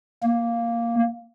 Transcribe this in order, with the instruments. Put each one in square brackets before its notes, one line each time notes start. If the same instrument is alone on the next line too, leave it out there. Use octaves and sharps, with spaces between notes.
[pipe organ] A#3